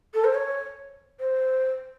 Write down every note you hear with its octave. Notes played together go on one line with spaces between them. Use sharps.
A4
C5
C#5
C5